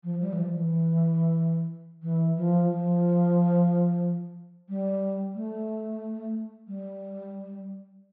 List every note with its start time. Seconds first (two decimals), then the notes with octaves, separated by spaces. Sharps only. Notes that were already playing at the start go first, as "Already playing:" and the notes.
0.04 F3
0.21 G3
0.33 E3
0.38 F3
0.54 E3
2.03 E3
2.37 F3
2.70 F3
4.69 G3
5.35 A3
6.68 G3